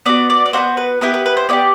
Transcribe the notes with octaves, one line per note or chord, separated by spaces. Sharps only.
B3 D4 F#4 D5
D5
D5
B3 D4 F#4 C5
B4
B3 E4 G4 B4
B4
B4
C5
B3 E4 G4 D5